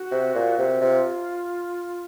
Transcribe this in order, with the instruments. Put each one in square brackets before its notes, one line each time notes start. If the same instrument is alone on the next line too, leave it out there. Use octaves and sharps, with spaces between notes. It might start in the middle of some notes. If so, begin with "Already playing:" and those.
Already playing: [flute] F#4
[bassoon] C3
A#2
C3
[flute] F#4
[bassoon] C3 [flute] F4